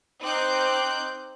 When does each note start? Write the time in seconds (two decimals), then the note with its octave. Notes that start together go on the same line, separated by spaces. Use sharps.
0.20 C4 D#4 D6 F#6 G6